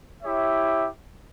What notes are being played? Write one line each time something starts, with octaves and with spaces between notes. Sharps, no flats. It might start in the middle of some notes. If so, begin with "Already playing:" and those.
E4 G4 C#5 E5